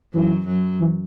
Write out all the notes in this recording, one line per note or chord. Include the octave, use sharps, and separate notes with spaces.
F#2 E3 F#3
F#2 F#3
E3